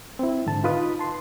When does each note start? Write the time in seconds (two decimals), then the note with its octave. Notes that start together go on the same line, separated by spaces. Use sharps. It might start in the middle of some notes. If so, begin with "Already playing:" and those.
0.19 C4 E4
0.46 G#2 D3 A5
0.64 D#4 F4 B4 D#6
0.99 A5 C6